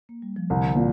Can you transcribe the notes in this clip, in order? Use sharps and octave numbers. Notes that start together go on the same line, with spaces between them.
A#3
G3
F3
C2 D3
D3
C3
A#2